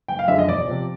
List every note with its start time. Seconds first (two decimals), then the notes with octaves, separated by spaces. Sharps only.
0.08 F#1 G5
0.19 F5
0.28 F#2 D3 F3 G#3 E5
0.38 D#5
0.48 E1 D5
0.67 C3 F3